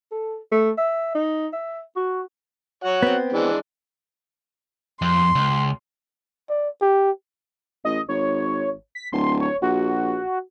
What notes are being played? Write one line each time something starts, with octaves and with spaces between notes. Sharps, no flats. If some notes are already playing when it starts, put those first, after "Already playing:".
A4
A3
E5
D#4
E5
F#4
F#4 C#5 F#5
B3 C4
E3 G#3 D4
F2 C6
C#2
D5
G4
A1 D#5
G#1 C#5
B6
D1 C6
C#5
A#1 F#4